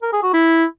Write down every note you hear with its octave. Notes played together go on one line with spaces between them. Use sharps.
A#4
G#4
F#4
E4